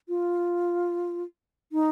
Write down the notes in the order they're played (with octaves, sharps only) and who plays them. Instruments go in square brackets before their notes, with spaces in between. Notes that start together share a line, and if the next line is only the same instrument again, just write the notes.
[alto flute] F4
D#4